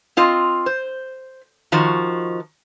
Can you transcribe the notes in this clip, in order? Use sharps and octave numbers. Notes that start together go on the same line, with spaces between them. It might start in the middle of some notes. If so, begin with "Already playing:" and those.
C4 F4 D#5
C5
D#3 F3 F#4